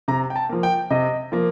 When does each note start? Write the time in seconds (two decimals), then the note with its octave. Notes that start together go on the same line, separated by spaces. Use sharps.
0.08 C3 A#5
0.30 G5
0.36 A5
0.49 F3 A#3
0.63 G5
0.90 C3 D#5
1.32 F3 A#3